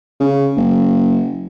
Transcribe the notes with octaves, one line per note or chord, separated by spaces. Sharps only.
C#3
F#1